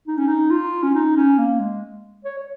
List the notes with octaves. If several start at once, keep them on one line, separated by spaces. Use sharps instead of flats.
D#4
C#4
D#4
F4
C#4
D#4
C#4
A#3
G#3
C#5
C#5